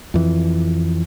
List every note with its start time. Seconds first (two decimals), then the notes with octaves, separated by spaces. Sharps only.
0.14 F2 E3